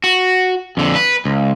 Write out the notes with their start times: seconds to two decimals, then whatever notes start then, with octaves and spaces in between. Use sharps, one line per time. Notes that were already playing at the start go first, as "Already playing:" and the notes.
0.04 F#4
0.77 F2 D3
0.96 B4
1.25 C#2